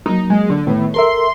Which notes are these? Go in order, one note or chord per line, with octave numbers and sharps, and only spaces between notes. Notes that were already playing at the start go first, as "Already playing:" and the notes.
F#3 A#3 D#4
G#3
D3
A2 D#3 B3
A4 A#4 E5 C6